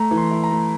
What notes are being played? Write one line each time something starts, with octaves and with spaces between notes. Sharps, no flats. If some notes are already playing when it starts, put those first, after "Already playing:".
Already playing: A3 A#5
E3
C6
E4
A#5
A3